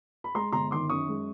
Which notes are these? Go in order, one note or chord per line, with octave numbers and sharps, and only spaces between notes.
B5
G#3 A#5 C6
G1 A#5 C6
D#3 C6 D6
F#2 C#6 D#6
G#3